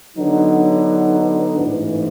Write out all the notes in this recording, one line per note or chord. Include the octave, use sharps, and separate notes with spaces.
D3 F#3 B3 D#4
A1 G#2 E3